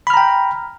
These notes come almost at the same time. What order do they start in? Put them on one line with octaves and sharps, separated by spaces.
B5 F6 A#5 G5